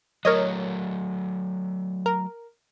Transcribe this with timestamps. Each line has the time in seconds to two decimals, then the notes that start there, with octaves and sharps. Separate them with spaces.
0.25 F#3 A3 A#4 C#5 D#5
2.06 A#4